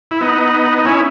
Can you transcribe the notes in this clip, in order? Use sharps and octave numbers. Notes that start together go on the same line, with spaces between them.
E4
B3 D#4
D#4
C#4 E4